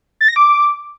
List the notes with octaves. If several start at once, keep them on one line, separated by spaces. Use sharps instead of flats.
A6
A#6
D6